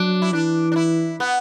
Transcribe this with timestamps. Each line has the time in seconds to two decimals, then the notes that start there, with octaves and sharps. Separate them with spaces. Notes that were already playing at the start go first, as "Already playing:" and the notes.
Already playing: F#3 D4
0.22 E4
0.32 E3 D4
0.72 D4
0.76 E4
1.20 B3